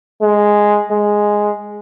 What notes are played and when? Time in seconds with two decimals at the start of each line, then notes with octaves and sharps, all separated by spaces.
0.21 G#3
0.90 G#3